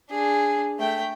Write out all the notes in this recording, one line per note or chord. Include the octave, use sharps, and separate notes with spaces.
D4 G#4
A3 G5